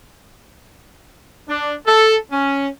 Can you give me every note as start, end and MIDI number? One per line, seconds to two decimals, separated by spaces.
1.49 1.75 62
1.87 2.17 69
2.32 2.68 61